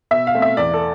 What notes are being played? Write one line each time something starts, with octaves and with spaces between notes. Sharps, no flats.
B2 E5
F5
A3 C4
E5
E2 D5
A4